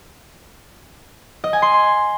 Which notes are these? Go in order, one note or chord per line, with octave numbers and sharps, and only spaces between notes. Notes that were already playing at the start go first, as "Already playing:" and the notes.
D#5
G#5
C6